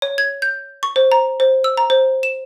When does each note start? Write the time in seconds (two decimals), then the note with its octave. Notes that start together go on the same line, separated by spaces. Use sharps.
0.02 C#5
0.18 G#6
0.42 G6
0.83 C#6
0.96 C5
1.12 A#5
1.40 C5
1.64 E6
1.77 A#5
1.90 C5
2.23 E7